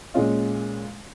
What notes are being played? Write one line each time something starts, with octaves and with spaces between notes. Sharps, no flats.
A#2 G#3 C#4 F4